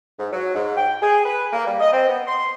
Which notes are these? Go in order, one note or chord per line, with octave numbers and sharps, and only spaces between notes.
G#2
F#3
G#2
G5
G#4
B4
A#3
G3
D#5
C4
B3
C6